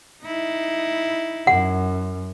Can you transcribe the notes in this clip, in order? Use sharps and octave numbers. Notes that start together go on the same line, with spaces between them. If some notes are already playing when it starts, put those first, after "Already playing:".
D#4 E4
F#2 F#5